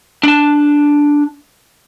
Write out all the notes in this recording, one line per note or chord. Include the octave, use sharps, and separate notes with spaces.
D4 A5